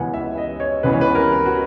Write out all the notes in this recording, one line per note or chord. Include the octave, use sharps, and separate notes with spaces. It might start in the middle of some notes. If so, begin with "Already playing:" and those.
Already playing: C#2 C#3 E3 B3 F#5 G#5
E5
D#5
C#5
C#2 C#3 E3 B3 B4
C#5
B4
A#4
F#4